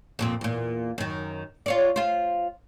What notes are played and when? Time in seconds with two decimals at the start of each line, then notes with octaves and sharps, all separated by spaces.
0.19 F2 A#2 C4
0.41 E2 A#2
0.98 F#2 D#3
1.66 F4 C#5 D5
1.96 F4 C5